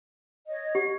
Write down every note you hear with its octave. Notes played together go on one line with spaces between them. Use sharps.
C#5 D#5
G4